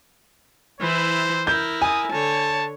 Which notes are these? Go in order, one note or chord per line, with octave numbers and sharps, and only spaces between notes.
E3 E4 C5
E4 A#4 G6
G#5 D#6
D3 C#5 A5